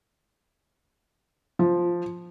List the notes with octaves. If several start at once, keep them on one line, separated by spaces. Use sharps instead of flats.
F3